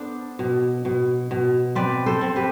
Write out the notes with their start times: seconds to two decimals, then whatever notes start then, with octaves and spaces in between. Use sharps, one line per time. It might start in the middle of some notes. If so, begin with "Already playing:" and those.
Already playing: B3 D4 A4 C5
0.39 B2
0.85 B2
1.31 B2
1.75 C4 B4 D5
2.06 A4 C5
2.21 C4
2.36 G4 B4